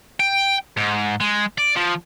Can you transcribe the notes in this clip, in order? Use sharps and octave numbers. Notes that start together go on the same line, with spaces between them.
G5
G#2
G#3
D5
F3